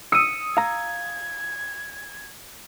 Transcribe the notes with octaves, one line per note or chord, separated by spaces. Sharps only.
D#6 E6 C#7 D#7
F5 A#5 G#6